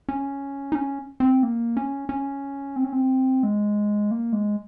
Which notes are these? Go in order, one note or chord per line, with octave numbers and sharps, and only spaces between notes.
C#4
D#4
C#4
C4
A#3
C#4
C#4
C4
C#4
C4
G#3
A#3
G#3